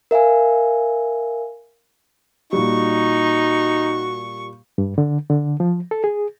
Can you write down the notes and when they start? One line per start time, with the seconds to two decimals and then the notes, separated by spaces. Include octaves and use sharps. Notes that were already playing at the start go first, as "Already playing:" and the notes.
0.11 A#4 E5 F5 G#5
2.53 A#2 G3 D#4 F#4 C#6
4.78 G2
4.98 D3
5.30 D3
5.60 F3
5.91 A4
6.04 G#4